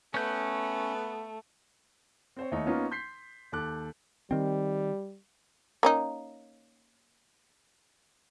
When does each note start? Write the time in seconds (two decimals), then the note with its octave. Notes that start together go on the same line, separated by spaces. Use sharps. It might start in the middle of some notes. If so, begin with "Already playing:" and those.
0.14 A3 B3 C#4 G6
2.37 C4 C5 C#5
2.52 D#2 A3 D#4 C#5
2.66 A#3 B3 C#4 D#4 F4
2.91 C6 G6 B6 C7
3.52 D#2 A4 D6 F#6
4.31 D#3 G3 C4
5.83 A#3 C#4 D#4